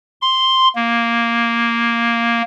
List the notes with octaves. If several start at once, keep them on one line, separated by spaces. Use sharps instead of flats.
C6
A#3